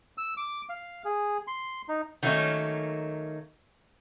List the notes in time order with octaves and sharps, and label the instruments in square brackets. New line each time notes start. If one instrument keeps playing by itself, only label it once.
[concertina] E6
D6
F5
G#4
C6
D#4
[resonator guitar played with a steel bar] D#3 F#3 A3 A#3 C#4 D#4